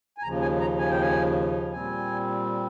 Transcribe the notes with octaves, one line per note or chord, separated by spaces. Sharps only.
G#5
D#2 C#3 F3 A#5
G#5
A#5
G#5
G5
G#5
A#2 G3 C4 G#5